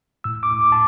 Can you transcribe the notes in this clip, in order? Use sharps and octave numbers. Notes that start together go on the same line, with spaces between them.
A2 E6
D6
A2
D6
A5